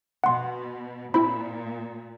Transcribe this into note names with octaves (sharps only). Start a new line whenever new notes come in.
B2 F#5 C6
A#2 C4 E4 B5